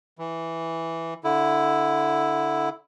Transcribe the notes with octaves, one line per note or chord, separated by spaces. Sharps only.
E3
D3 E4